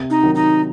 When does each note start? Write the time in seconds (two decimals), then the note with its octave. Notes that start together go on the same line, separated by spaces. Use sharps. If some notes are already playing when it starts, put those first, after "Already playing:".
Already playing: C3
0.10 D#4
0.23 D#3 F#3
0.35 D#4